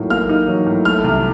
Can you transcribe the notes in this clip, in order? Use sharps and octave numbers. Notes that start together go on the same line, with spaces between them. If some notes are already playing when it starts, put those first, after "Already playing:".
Already playing: A2 F#3 A#3 D#4
A#3 F6
D#4
F#3
A2
A3 F6
C2